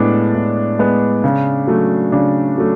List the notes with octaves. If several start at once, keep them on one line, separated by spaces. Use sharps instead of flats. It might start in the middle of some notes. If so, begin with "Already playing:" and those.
Already playing: A2 G#3 B3 D4
A2
G#3 B3
C#3
F#3 A3
C#3 D4
F#3 A3